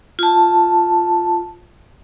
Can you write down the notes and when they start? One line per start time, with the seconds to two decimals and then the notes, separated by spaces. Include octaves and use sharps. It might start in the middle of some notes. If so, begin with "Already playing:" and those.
0.19 F4 A5